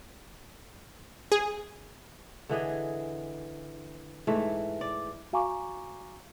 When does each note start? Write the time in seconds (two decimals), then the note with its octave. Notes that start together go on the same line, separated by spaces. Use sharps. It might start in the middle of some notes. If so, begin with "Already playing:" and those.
1.32 G#4
2.49 D3 E3 G#4 D#5
4.27 G#2 E3 A3
4.81 D5
5.33 F#4 F5 G#5 A#5 C#6 D6